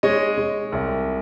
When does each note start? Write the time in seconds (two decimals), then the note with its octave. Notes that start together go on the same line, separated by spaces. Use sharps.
0.03 G#3 C#5 D#5
0.38 G#3
0.72 C2